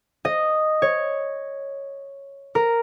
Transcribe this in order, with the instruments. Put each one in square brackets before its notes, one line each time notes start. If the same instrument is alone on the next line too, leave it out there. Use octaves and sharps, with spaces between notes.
[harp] D#5
C#5
A#4